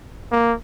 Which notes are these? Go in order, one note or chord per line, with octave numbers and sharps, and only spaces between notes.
A#3